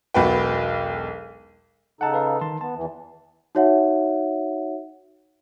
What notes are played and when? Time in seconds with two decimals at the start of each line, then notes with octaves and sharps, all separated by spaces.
0.14 E1 B1 F#4 B4 G5
2.01 C#3 D#4 A4 F#5 A5
2.14 B4 F5
2.41 D#3 A5 C6
2.61 B3 A5
2.75 E2 E3
3.55 D#4 F#4 C#5 E5 F#5